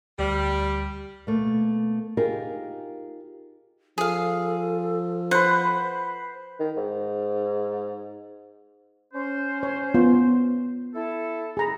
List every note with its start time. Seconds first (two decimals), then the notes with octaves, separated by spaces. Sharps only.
0.19 D2 G3 F6
1.27 B2 A3 A#3
2.17 D#4 F4 G4 G#4 A#4
3.98 F3 G#4 A4 F5
5.31 B4 C5 F#5
6.59 D#3
6.77 G#2
9.14 C#4 C5
9.63 C#5
9.94 B3 F4
10.94 E4 A4
11.57 G#4 A#5 B5